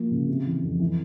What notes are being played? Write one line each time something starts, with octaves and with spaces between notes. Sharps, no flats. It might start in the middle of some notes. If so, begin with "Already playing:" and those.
Already playing: F3 A#3
C#3
C3
E3
F2
E3